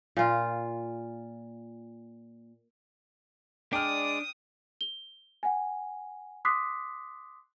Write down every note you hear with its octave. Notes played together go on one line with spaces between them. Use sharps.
A#2 F4
G#3 D4 D5 G5 D#6 F6
G7
F#5 G#5
C6 D6 D#6 F#6 B6 C7